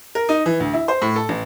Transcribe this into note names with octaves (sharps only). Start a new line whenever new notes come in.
A#4
D#4
E3
D2
E4
C5
A2
A4
A1